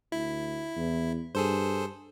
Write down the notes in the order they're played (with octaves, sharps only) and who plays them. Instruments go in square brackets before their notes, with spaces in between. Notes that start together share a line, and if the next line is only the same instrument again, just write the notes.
[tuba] D2 [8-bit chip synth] E4
[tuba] E2
[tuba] G2 [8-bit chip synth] G#4 A4 C5